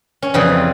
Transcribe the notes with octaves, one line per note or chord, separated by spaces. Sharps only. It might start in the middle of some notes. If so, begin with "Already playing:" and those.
C#4
F2 C#3 E3 G3 C4